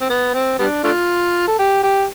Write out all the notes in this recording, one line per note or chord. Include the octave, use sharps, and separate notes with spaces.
C4
B3
C4
G3 B3 D4
A3 D4 F4
A4
G4
G4